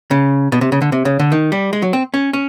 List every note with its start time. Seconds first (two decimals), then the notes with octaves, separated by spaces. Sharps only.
0.11 C#3
0.52 B2
0.61 C3
0.72 C#3
0.82 D3
0.92 C3
1.05 C#3
1.19 D3
1.32 D#3
1.52 G3
1.73 G#3
1.82 F#3
1.93 C4
2.14 C#4
2.33 C#4